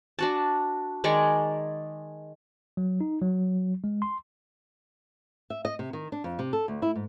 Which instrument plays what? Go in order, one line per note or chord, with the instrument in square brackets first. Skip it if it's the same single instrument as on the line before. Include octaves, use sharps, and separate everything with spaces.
[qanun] D4 F#4 A5
D#3 G#3 D5 C#6
[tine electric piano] F#3
D#4
F#3
G#3
C6
[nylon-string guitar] E5
D#5
C3
D#3
D4
F2
C3
A4
D2
E4
G#2